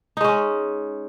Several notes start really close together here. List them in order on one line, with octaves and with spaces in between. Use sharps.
D#4 G#3 C#4